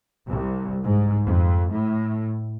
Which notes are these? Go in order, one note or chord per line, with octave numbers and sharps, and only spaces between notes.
C2
G#2
F2
A2